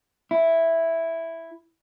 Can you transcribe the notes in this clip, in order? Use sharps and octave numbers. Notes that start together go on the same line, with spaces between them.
E4